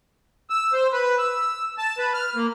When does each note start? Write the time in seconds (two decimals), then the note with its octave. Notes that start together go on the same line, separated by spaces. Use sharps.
0.50 E6
0.73 C5
0.92 B4
1.18 E6
1.78 A5
1.98 B4
2.14 F6
2.35 A#3